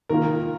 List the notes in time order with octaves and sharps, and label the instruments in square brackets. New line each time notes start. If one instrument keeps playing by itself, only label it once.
[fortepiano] D#3 A#3 F4 [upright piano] A#4